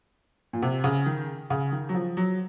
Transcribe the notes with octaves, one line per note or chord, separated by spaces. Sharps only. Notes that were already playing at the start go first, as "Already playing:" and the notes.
A#2
C3
C#3
D#3
C#3
D#3
F#3
F3
F#3